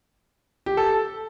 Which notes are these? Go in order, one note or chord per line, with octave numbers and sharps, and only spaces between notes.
G4
A4